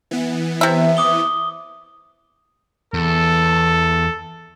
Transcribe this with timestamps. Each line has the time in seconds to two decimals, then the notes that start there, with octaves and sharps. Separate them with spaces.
0.11 E3 B3
0.61 C3 E5
0.97 D6 D#6 G7
2.94 E2 A4